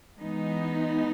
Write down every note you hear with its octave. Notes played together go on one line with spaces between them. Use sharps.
E3 G#3 B3 D#4